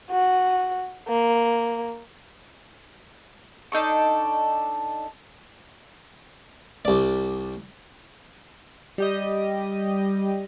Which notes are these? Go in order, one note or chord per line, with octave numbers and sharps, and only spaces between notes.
F#4
A#3
D4 D#4 A4 C#6
C2 D5
G3 G4 D#5